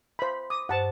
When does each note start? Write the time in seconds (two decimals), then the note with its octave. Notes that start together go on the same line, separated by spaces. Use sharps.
0.19 C5 B5
0.50 D6 D#6
0.69 G2 C5 F#5 A5